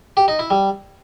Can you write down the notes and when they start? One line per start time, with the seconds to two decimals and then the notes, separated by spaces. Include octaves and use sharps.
0.17 G4
0.28 D#4
0.39 E4
0.50 G3